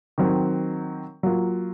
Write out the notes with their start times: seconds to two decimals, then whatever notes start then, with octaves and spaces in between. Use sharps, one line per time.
0.18 D#3 F#3 C4
1.23 F#3 A#3 F4